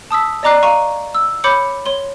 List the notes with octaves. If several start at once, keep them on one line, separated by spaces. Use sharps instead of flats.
A5 D#6 E6 B6
D5 D#5 A#5 D6 F#6 C7
F5 A#5 C#6 D#7
E6
C#5 B5 D6 G6 C#7
C#5 C6 G7